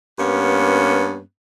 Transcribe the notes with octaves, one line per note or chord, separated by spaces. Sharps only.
G2 A#3 B3 C#4